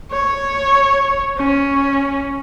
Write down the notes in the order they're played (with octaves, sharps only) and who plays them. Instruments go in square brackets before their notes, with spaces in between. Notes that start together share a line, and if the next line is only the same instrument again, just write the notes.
[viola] C#5
C#4